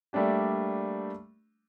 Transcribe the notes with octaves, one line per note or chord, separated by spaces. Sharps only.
G3 A3 A#3 D4 G4